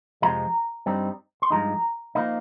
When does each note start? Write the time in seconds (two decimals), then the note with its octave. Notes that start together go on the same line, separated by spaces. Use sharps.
0.22 F2 C3 F3 G#3 A#5
0.86 G2 G3 C4 D#4
1.42 C6
1.50 G2 F3 G#3 D#4 A#5
2.15 F3 A#3 D#4